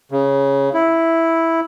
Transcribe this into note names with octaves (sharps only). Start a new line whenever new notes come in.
C#3
E4